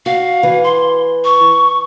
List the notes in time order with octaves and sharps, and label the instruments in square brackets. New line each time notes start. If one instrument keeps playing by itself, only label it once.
[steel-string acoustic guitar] F#4 [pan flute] F5
[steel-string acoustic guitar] E3
[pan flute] C6
C#6